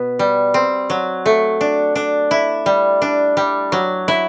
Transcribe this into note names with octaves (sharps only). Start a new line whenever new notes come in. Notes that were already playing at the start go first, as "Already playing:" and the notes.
Already playing: B2 B3
G3
C4
F#3
A3
D4
D4
E4
G3
D4
G3
F#3
E4